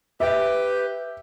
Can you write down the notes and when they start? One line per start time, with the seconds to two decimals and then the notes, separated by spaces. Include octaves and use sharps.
0.20 G4 B4 E5